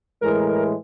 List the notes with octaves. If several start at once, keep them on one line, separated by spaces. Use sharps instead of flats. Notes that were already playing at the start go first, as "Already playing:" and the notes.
A2 E3 G#3 A#4